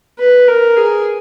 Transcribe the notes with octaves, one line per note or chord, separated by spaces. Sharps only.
B4
A#4
G#4